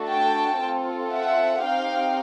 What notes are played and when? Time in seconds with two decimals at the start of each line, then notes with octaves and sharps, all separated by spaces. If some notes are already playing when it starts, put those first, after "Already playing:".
Already playing: A3 D4 F#4 A4
0.09 G5 A5
0.61 C4 F4 A4
1.13 E5 F#5
1.64 C4 D#4 G4 F5 G5